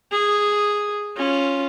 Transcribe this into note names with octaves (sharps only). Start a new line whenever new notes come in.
G#4
C#4 F4